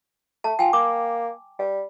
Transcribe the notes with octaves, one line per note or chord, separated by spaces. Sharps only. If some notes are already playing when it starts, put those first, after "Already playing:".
A3 A5
F4 G5 G#5
A#3 D6
G3